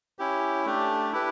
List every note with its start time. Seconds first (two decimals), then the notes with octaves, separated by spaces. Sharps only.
0.19 C#4 E4 G4
0.66 A3 D4 G4
1.13 E4 G4 B4